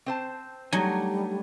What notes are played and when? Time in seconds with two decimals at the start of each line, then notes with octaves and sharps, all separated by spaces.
0.06 C4 C5 A5
0.73 F#3 G3 A3 D4 D#4 G#5